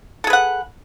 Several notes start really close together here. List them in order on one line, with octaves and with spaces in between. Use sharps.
A4 G#4 B4 F#5